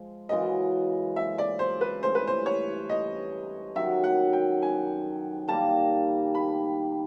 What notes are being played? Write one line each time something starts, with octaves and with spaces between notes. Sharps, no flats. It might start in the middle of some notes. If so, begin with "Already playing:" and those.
Already playing: F3 G#3
F#2 C#3 E3 G#3 D#5
E5
D5
C5
B4
G2 E3 A3 C#4 C5
B4
C5
C#5
D#5
F#2 D#3 F#3 E5
F#5
G5
G#5
D#3 G3 A#3 D#4 A5
B5